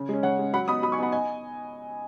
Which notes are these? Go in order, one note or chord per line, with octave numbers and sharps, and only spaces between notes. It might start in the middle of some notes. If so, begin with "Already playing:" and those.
Already playing: C#3
G#3 C#4
C#3 C#5 F#5
G#3 C#4
F#3 F#5 B5
B3 D#4 B5 D#6
F#3 B5 D#6
G#5 C#6
B3 D#4 F#5 B5
D#5 G#5